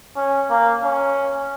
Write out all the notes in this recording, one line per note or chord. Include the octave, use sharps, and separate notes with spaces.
C#4
A#3
C#4